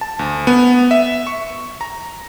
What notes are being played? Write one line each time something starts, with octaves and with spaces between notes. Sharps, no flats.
A5
D2
B3
E5
C#6
A#5